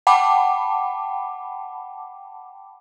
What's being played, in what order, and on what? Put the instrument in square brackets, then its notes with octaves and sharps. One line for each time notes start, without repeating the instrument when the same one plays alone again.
[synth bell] F#5 G5 A5 B5 D6